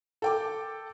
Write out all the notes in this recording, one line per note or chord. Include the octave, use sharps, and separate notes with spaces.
A4 G5 D6